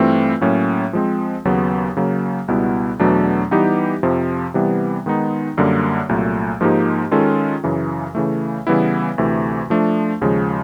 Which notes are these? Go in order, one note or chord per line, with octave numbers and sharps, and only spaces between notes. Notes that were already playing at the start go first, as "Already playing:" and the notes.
Already playing: G2 E3 A3 C4 F4
A2 F#3 A#3 C#4
F3 G#3 C4
D#2 C#3 F#3 B3
C#3 F#3 A#3
C#2 B2 G3 B3 E4
E2 B2 F#3 A3 D4
E3 G3 B3 D#4 G4
F2 C3 F3
C3 E3 G3 B3
D#3 G#3 B3 D#4
F#2 D3 G3 A#3
C2 A#2 F#3 A3
G#2 F3 A#3 D#4 G4
D#3 G#3 C#4 F4 A4
F#2 C#3 E3
C#3 E3 A3
C#3 E3 G3 B3 E4
D2 C3 E3 A3
F3 A3 D4
D#2 C#3 F3 G#3